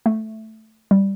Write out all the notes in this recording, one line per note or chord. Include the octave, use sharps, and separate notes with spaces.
A3
G3